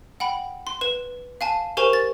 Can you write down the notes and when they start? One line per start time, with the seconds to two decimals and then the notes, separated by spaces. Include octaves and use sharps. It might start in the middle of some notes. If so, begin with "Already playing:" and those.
0.20 F#5 G5 B5
0.67 C6
0.81 B4 E7
1.41 F5 G#5 A5
1.77 G4 A#4 C5 G#5 C#6 F7
1.93 A6